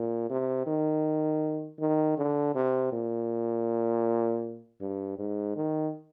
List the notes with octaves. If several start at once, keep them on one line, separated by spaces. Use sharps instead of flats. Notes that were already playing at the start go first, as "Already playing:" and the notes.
Already playing: A#2
C3
D#3
D#3
D3
C3
A#2
G2
G#2
D#3